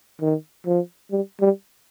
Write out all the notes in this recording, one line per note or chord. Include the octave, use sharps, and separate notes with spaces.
D#3
F3
G3
G3